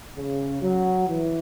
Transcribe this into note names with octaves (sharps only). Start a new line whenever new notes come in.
C#3
F#3
E3